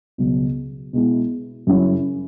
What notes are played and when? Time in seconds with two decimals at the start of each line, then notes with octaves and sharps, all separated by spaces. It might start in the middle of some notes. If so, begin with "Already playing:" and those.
0.18 C#2 B2 F#3
0.93 B2 G#3 B3 E4
1.67 F#2 C#3 F#3 C#4 E4